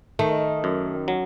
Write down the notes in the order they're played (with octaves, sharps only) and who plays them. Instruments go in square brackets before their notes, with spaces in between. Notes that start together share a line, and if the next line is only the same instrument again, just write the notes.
[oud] D#3 [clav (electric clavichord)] A3
[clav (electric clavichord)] F#2
F#3